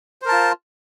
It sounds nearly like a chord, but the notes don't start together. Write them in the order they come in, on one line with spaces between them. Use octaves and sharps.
C5 A#4 A5 F4